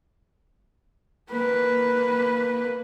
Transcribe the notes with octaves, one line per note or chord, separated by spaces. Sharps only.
A#3 B4